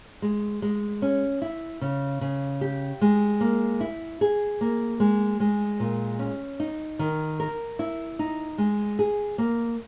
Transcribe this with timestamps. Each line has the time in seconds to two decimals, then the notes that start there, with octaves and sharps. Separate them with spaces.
0.22 G#3
0.62 G#3
1.02 C#4
1.42 E4
1.81 C#3
2.21 C#3
2.61 G4
3.01 G#3
3.41 A#3
3.81 E4
4.21 G#4
4.61 A#3
5.00 G#3
5.40 G#3
5.80 A#2
6.19 C#4
6.60 D#4
6.99 D#3
7.40 A#4
7.79 E4
8.19 D#4
8.58 G#3
8.99 G#4
9.38 A#3